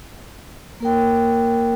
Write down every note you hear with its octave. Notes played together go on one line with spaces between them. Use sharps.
A#3 A#4 G5